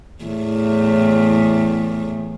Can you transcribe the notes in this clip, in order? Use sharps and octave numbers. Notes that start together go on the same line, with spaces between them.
E2 A2